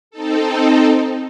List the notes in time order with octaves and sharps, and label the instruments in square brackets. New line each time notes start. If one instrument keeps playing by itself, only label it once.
[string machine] C4 D#4 A4